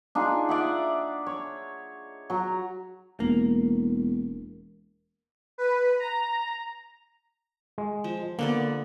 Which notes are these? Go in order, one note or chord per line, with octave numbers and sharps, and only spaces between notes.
D4 D#4 F4 G#4
D5 E5 F#5
C#5
F#3 A#5
E1 A#3
B4
A#5
G#3
F3
D3 A#3 B3 D5